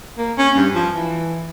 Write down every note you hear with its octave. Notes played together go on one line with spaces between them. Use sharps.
A#3
C#4
G2
F3
E3